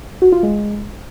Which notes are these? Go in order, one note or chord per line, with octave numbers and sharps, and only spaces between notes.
F#4
F4
G#3